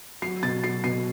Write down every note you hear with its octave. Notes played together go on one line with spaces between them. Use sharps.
F#3 C7
B2 A6
F#3 C7
B2 C7